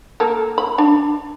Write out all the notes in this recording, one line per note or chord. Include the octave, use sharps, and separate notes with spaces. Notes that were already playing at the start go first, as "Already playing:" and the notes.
A#3 A4
B5
D4